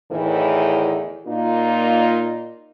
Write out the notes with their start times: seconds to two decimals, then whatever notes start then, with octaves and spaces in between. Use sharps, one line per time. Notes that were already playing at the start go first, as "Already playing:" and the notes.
0.11 E2 A2 D#3 E3
1.27 A#2 A#3 D#4 F4